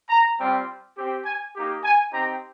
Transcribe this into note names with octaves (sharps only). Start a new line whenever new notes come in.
A#5
G3 C4 F4
C4 G4
G#5
A#3 D#4 G4
G#5
C4 D#4 G4 A#5